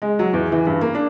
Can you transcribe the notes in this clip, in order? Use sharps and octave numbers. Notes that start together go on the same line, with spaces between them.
G#3
F#3
E2
E3
G2
A#3
D4